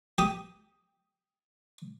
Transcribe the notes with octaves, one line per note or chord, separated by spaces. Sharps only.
G4 D#6